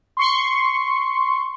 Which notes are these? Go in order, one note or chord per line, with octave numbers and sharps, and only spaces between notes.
C6 C#6